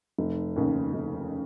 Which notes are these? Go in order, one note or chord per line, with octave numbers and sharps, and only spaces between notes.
F1
D#2 C#3
F1